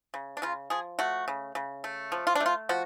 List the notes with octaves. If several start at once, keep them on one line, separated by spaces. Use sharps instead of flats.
C#3
D4
C#3 F4
F3 G#4
A3 F#4
C#3
C#3
A3
F3
F4
D4
A3
F4
F3 F#4